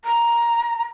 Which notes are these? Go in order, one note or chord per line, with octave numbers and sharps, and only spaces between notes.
A#5